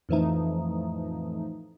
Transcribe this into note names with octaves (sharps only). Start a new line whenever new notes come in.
F2 A2 E3 F3 A3 D#4